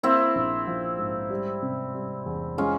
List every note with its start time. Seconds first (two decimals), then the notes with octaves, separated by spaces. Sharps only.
0.03 A#3 C4 E4
0.35 A#1
0.67 F3
0.99 G#2
1.30 G3
1.62 C3
1.94 G3
2.26 E2
2.58 G#3 C#4 F4